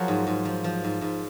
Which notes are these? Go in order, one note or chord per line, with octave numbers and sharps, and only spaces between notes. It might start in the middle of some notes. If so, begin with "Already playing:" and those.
Already playing: F3 F#3 F#4 G#4 A#4
G#2
G#2
F3
F3
G#2
G#2